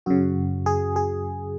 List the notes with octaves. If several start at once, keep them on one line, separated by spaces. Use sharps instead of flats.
F#2 C#3 F#4
G#4
G#4